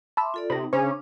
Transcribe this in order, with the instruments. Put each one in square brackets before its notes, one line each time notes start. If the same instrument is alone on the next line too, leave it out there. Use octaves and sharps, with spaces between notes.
[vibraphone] E5 C6 D6 [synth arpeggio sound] A5 B5 E6
[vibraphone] F4 A4 D5
[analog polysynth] C3 [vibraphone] D#4 [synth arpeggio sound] B5 A#6
[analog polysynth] C#3 C#4 [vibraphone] D4 D6 [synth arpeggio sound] C5